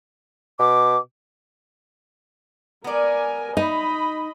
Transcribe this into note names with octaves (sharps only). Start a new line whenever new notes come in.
B2 D6
B3 A#4 D5 G#5
D#4 D#5 B5